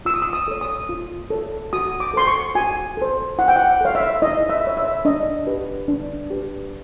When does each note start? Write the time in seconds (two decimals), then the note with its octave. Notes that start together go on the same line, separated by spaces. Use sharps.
0.05 F4 E6
0.14 D#6
0.22 E6
0.33 D#6
0.48 A4 C#5
0.61 D#6
0.89 F4
1.30 A4 C#5
1.73 F#4 D#6
2.00 D6
2.14 A4 C5 C6
2.28 C#6
2.55 F#4 G#5
2.97 A4 C5
3.39 E4 F#5
3.48 G5
3.56 F#5
3.81 A4 C#5 F5
3.95 E5
4.22 E4 D#5
4.50 E5
4.63 A4 C#5
4.77 E5
5.05 D4 D#5
5.47 G4 B4
5.88 D4
6.30 G4 B4